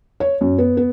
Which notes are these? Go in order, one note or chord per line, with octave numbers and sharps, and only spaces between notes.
C#5
F#2
B3
B3